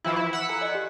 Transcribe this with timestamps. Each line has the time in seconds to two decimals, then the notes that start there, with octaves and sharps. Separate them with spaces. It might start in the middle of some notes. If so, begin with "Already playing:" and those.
0.04 E3 F3 E4 E5 B5
0.16 E4
0.33 F#5 E6 B6
0.49 A4 G#5 A#5
0.61 D5 D#5
0.75 G4